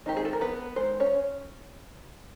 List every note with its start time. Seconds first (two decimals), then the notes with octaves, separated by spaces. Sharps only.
0.06 D#3 G#3 C4 D#4 G4
0.17 G#4
0.25 A4
0.33 A#4
0.41 B3 B4
0.76 D#3 G#3 C5
1.00 C#4 C#5